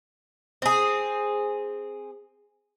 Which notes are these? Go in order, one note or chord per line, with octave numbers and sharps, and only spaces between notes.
C4 G#4